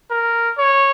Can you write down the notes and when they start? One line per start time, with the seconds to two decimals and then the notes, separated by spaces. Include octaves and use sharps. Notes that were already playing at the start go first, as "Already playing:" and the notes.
0.11 A#4
0.58 C#5